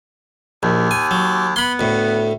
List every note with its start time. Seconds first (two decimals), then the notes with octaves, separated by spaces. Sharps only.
0.63 A#1 D#2
0.91 G#5
1.11 F#3
1.56 B3 B5 C6
1.79 D2 A2